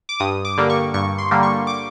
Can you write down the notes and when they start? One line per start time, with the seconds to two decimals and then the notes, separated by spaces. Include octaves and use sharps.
0.09 D6
0.20 G2 D#6
0.45 D6
0.57 D3 G3 A#3
0.70 C#6
0.94 G2 C#6
1.18 C6
1.31 D3 G3 A#3
1.43 C#6
1.67 D6